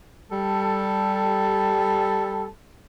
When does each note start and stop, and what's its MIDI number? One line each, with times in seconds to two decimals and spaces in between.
0.30 2.46 55
0.30 2.46 69